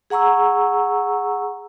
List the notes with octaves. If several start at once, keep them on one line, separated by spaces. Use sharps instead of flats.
G#4 F#5 A#5 C#6 E6